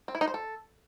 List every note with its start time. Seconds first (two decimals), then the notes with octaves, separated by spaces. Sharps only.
0.08 C4
0.15 E4
0.21 D#4
0.28 C5
0.34 A4